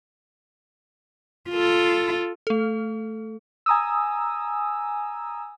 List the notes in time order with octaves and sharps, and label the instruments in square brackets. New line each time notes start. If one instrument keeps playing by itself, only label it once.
[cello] F4 A4
[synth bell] A3 A4
[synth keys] G#5 A#5 D#6 E6